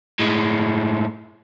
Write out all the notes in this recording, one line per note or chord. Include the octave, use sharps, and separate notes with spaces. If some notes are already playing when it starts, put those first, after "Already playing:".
A2 G#3